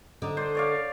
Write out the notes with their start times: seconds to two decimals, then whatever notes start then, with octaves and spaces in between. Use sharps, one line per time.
0.22 D3 D#4
0.37 C5 D5
0.55 C#5 D5 F5